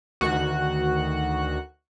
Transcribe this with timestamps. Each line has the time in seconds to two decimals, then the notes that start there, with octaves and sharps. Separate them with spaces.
0.21 D2 D#3 F#4 F#5 F#6